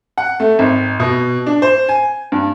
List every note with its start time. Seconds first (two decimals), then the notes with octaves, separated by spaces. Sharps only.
0.18 F#5
0.40 A3
0.59 G#1
1.00 B2
1.46 D4
1.62 C5
1.89 G#5
2.32 G2